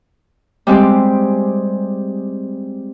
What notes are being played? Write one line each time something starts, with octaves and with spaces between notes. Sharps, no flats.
G3 G#3 C4 G4